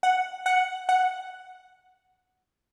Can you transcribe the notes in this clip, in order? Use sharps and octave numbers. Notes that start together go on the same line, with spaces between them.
F#5
F#5
F#5